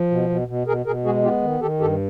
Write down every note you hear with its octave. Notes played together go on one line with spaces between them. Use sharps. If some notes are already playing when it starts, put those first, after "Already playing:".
Already playing: F3
B2
B2
B2
B2 G#4 A#4
B2 G#4 A#4
G#3 F#4 G#4
B3 F4 G4
D#3
D#3 G4 A4
G2 G4 A4